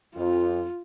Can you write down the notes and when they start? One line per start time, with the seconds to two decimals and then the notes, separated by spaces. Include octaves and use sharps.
0.16 F2 F4